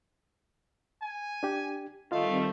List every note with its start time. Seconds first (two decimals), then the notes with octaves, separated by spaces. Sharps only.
1.02 G#5
1.43 D4 G4
2.12 D#3 G3 A3 C4 F4 D#5 F5